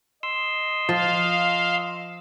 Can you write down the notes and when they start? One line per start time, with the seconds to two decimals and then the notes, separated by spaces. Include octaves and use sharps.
0.23 D#5 C6 E6
0.89 F3 F5